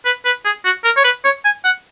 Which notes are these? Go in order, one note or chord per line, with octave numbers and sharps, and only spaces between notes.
B4
B4
G#4
F#4
A#4
C#5
B4
C#5
G#5
F#5